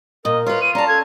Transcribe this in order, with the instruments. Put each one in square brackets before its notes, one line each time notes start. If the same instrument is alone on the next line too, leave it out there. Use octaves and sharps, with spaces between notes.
[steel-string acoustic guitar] A#2 [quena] A#4 [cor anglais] D#5
[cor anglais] F4 [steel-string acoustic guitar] B4 C#5
[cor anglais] F4 [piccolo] D#7
[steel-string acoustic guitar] C#4 A5 [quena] D5 [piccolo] A#5
[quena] A4 [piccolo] G#6